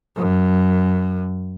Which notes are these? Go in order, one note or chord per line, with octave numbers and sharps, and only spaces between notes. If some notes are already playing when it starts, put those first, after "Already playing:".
F#2